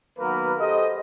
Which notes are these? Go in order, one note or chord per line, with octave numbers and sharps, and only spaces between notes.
D#3 F#3 A#3 B3 A#4 B4
G4 A4 C5 D#5